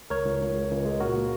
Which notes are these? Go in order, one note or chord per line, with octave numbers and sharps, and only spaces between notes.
C#2 A#4 C#5
C#2
C#2
C#3
C#2
G#3
A#2 F#4 A#4
A#3